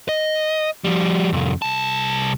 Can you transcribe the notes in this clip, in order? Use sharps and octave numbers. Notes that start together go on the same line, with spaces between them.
D#5
F3 G3
C2 F2
C2 A5